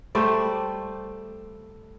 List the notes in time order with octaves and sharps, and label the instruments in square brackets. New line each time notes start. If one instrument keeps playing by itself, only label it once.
[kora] G3 A3 C5 D5